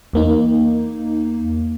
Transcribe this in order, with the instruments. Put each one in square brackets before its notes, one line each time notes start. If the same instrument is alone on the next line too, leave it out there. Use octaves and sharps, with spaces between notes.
[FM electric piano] E2 A#3 D#4